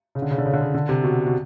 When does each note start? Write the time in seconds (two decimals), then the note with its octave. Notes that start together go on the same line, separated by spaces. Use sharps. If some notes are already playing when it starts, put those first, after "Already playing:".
0.15 C#3
0.22 D3
0.31 C#3
0.38 D3
0.46 C#3
0.53 D3
0.61 C#3
0.74 D3
0.89 C3
1.04 B2
1.27 B2